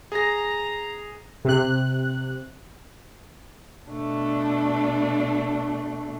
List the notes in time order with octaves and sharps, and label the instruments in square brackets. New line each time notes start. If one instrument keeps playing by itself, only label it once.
[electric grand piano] G#4 A#6 [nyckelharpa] A#5
[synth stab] C3 F#6
[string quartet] B2 A3 D4